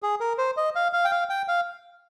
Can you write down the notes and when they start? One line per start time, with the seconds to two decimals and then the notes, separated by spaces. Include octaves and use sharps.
0.03 G#4
0.20 A#4
0.38 C5
0.57 D#5
0.75 F5
0.93 F5
1.05 G5
1.11 F5
1.30 G5
1.48 F5